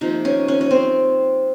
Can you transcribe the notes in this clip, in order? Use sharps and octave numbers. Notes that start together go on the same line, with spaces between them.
C3 F3 A#3 D#4
C#4
C#4
C#4
C4